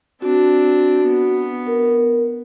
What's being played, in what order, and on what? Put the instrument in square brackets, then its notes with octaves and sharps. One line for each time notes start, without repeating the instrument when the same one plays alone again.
[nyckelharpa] C4 D4 [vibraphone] F#4
[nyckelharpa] B3
[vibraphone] A#4